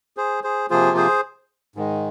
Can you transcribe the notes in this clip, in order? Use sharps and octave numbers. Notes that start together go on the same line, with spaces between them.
G#4 C5
G#4 C5
C3 F3 A#3 F4 G#4 C5
G#4 C5
G#2 D#3 G#3